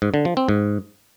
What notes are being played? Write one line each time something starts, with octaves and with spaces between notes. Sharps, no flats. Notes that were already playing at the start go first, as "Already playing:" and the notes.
G#2
D3
F3
C4
G#2